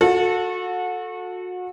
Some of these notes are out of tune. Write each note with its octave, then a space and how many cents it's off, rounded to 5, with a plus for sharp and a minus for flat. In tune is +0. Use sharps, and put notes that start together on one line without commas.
F#4 -30 A4 +0